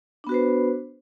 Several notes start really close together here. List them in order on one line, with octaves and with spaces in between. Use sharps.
D4 B3 F#4 B4 C5